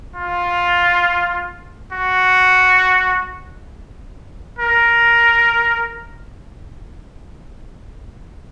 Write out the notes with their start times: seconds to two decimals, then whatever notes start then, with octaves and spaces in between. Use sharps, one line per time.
0.16 F4
1.93 F#4
4.59 A#4